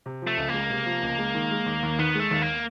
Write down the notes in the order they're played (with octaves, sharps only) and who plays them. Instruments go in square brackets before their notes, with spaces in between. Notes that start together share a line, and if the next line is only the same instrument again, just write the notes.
[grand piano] C3
F3
[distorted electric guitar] A3
[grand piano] C#2
[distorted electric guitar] A#3
[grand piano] G#3
C3
F3
C#2
G#3
D#3
G#3
D#2
D#2
[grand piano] D#3 [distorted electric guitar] B3
[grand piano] G#3 [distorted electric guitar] A3
[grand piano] D#2
[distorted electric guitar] A#3